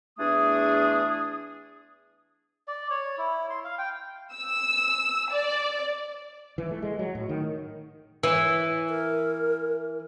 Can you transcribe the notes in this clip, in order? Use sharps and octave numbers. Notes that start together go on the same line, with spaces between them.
E2 A3 D4 G#4 D#6
D5
C#5
E4
C6
F5
G5
E6
D5
E3
A3
G#3
F#3
A2
D#3
E3
A#4